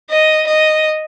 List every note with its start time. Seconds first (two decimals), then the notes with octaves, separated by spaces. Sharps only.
0.11 D#5
0.47 D#5